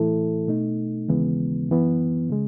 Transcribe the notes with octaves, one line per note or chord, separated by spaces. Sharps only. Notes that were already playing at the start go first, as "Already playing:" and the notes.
Already playing: A2 E3 A3 E4 A4
B2 A3 D#4
D#2 C#3 E3 G#3 B3
F#2 E3 B3
C#3 G#3